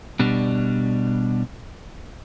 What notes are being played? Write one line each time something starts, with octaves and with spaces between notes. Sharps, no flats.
B2 G3 D4